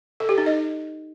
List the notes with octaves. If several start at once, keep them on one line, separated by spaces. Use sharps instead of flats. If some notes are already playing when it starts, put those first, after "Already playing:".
A4
G4
D#4
D#5